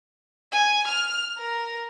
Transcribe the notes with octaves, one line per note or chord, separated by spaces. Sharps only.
G#5
F6
A#4